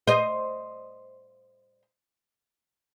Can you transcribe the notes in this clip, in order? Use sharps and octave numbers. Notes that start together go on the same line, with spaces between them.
C5 D#5